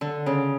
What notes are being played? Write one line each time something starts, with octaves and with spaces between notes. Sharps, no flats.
D3
C#3